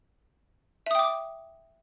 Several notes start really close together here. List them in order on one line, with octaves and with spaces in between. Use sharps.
E5 D#6 G5 D6